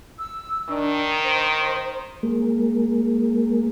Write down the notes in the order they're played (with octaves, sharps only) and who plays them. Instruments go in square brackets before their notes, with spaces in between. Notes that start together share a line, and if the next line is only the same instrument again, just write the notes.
[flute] E6
[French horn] D#3 [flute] D4
[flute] C5
[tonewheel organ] G#3 A#3